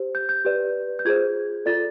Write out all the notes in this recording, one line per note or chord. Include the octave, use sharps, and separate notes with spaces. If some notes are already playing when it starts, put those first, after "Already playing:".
Already playing: G4 C5
G6
G6
G4 B4 D5
G6
F4 G#4 C5 G#6
F4 A4 D5 A6